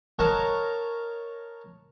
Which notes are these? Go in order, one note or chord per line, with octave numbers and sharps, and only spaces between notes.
A#4 C#5 D#5 F#5 A5 A#5